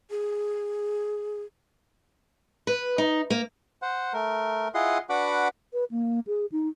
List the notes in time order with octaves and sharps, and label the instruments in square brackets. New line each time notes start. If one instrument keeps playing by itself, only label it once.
[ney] G#4
[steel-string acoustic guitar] B4
D#4
A#3
[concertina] C5 F#5
A3 A#4
E4 F4 G#4 D#5 F#5 C6
D4 F#4 B4 F#5 B5 D6
[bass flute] B4
A#3
G#4
D#4